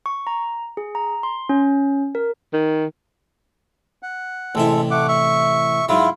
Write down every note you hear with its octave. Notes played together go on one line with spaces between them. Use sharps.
C#6
A#5
G#4
A#5
C6
C#4
A#4
D#3
F#5
A1 C3 G#3 E4 A4
A3 F#5 D6
E5 C#6
G#2 F#3 E4 F4